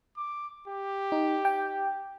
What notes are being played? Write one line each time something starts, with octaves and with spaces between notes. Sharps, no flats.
D6
G4
D#4
G5